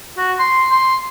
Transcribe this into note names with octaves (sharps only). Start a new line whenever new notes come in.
F#4
C6
C6